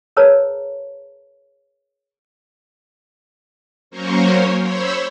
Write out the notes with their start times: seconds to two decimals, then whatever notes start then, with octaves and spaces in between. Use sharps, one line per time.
0.17 G#4 A#4 B4 C#5 A5 A#5
3.91 F#3 A#3 C#4 A#4 C5 C#5
4.63 C5 C#5 B5 E6